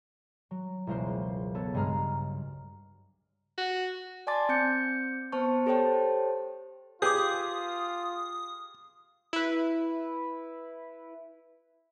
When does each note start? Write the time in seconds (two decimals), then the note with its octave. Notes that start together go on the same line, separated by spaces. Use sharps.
0.51 F#3
0.87 E1 C#2 A#4 C5
1.54 B3 A4 C#5
1.74 B1 G2 C#3 G#3 A#5 F6
3.58 F#4
4.27 D5 G#5 A5 C6 D6 A6
4.49 C4 G6 C#7
5.32 B3 C5 A5 C#6
5.66 G4 A4 C5 C#5 G5 A5
7.02 F4 G4 G#4 B4 D6 D#6 G6
9.33 E4 B4